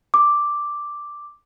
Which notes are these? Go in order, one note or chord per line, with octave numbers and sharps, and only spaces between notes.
D6